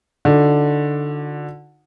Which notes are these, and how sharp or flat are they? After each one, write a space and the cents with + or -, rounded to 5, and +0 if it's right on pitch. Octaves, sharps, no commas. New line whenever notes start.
D3 +0 D#4 +0 F#4 -40